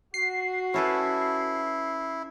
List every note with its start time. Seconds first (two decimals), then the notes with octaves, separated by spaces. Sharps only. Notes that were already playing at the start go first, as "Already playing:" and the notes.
0.14 F#4 C7
0.74 C#4 E4 A4 B4